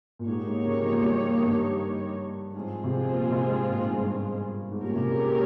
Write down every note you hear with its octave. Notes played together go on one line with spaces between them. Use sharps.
A#2
G#2 D#3 A#3 D#4 G4 C#5
G#2
C#3
F3
G3
G2
G#2 F3 G#3 C4 F4 G#4
C3
A#2
C3
G#2
A#2
G#2
G2
G#2
G#2
A#2 C#4 G4 A#4 C#5
C3
G#3
A#3